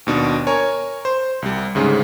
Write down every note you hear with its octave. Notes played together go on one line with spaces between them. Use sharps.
D#2 B2 D4
A#4 C#5 G#5
C5
C2 G3
D2 G#2 C#3